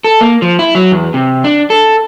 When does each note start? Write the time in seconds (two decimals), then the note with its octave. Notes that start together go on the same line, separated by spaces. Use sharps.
0.04 A4
0.21 A#3
0.42 F3
0.59 E4
0.75 F#3
0.92 E2
1.14 C3
1.44 D4
1.70 A4